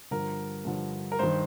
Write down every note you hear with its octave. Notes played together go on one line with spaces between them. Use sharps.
G2 D3 F3 A#4
G2 D3 F3
A#4
G2 D#3 C5